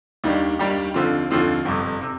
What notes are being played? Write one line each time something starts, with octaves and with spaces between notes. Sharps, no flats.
D#2 D#3 G3 D4 G4
D#2 D#3 G3 D4 G4
D#2 D3 F3 C4 F4
D#2 D3 F3 C4 F4
G1 F2 C3
C3